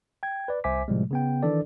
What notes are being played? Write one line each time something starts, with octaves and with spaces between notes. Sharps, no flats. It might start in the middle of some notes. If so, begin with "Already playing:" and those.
G5 G#6
B4 D5
C2 C5 E5 G#5 D6 B6
A2 C3 F3 G3 G#3
C#3 B3 G5
D#3 E3 D4 A4 D5